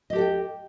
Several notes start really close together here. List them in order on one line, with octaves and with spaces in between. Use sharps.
D#5 G4 A4 F#5 G5